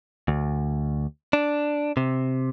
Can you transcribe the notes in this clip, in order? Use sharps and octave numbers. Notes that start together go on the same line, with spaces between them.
D2
D4
C3